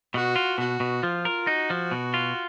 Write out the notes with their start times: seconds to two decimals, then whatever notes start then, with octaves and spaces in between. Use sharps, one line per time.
0.14 B2 F#4
0.36 F4
0.58 B2 F#4
0.80 B2
1.03 F3 F4
1.25 A#4
1.47 D#4 F#4
1.70 F3
1.91 B2
2.14 F4